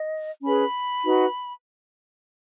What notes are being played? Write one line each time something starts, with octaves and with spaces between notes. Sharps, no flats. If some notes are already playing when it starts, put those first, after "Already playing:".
Already playing: D#5
C#4 G#4 B4 B5
D#4 F#4 B4